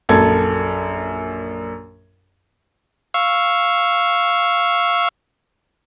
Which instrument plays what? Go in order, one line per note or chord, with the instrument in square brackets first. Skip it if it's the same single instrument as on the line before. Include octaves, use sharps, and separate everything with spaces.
[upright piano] A#1 F#2 A4 G#6
[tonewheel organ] F5 C#6 E6